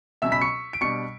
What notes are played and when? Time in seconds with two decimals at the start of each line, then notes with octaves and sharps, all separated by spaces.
0.22 C#2 B2 F#3 C#4 E5 E6
0.32 B5 B6
0.41 C#6 C#7
0.73 D7
0.81 B2 G3 D4 C#6 C#7